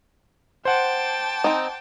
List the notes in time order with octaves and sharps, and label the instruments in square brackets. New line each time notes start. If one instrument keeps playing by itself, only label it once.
[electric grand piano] C5 F#5 [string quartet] G5 A5 D6
[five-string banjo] C4 D#4